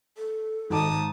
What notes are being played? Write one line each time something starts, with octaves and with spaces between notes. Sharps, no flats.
A4
G#1 G#2 D#4 A5 D6 D#6